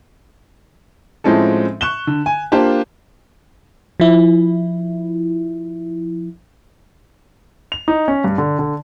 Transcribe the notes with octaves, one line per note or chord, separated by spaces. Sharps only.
A2 F3 G#3 C4 C#4 A4
C#6 F#6 E7 G7
D3
G#5
A#3 D4 F4 G4 C5
F3 E4
F7
D#4
C#4
G2
D3
D3